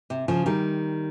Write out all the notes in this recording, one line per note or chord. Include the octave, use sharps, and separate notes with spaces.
C3
C#3 F3
D#3 G3